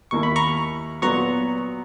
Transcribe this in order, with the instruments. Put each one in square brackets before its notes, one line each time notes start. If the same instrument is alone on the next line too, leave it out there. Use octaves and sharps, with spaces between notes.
[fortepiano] D#2 D#3 A#3 E4 A#4 [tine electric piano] C#6
[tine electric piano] B5
A#5 C#6
[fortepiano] A#2 F#3 B3 [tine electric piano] A#5 C#6